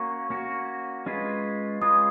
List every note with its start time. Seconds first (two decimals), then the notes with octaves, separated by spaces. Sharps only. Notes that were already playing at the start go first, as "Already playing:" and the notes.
Already playing: A#3 C#4 F#4 C#6
0.30 A#3 C#4 F#4
1.06 G#3 C#4 F4 B4
1.82 G#3 C#4 F4 B4 D#6